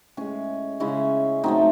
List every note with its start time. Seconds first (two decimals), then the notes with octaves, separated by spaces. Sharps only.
0.17 A2 G#3 C#4
0.80 C#3 G#3 C#4 E4
1.43 A2 F#3 A3 C4 D#4